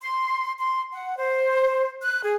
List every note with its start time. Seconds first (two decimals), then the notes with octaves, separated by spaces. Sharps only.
0.01 C6
0.60 C6
0.94 F#5
1.17 C5
2.01 F#6
2.23 G#4